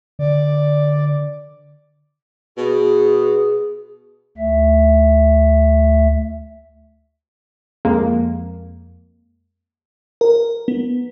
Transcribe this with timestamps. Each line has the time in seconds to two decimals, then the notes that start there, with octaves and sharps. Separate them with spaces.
0.19 D3 D5
2.57 B2 G#4
4.38 D2 A3 E5
7.85 F2 G#3 A#3
10.21 A#4
10.68 B3